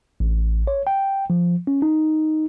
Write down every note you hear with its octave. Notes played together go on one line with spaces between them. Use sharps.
A1
C#5
G5
F3
C#4
D#4